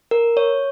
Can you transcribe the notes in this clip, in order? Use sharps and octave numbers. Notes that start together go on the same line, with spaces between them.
A#4
C#5